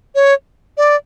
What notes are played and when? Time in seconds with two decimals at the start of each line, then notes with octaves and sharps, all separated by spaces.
0.15 C#5
0.77 D5